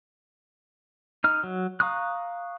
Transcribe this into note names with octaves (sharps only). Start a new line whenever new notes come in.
D#4 F6
F#3
F5 A#5 C#6 D#6 F#6